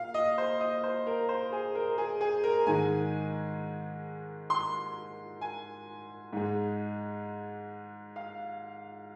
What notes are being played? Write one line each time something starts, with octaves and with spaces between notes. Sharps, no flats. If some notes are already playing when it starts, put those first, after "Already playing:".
Already playing: A#2 F5
D#5
C5
D#5
C5
A#4
C5
G#4
A#4
G#4
G#4
A#4
G#2 D#3 G#3 G#5
C6
G#5
G#2 G#3
F5